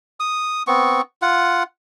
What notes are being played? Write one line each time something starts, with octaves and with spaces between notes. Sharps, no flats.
D#6
B3 C4 C#6
F4 F#5